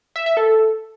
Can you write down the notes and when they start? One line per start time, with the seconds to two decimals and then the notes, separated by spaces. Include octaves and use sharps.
0.16 E5
0.26 E5
0.37 A4